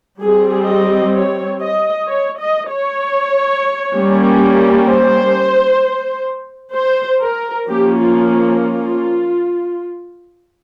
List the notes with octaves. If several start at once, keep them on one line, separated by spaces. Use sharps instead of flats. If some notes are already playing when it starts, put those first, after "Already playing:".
G3 C4 G#4
D#5
C#5
D#5
C#5
D#5
C#5
G3 A#3 C#4
C5
C5
A#4
F3 A#3 C#4 G4
F4
F4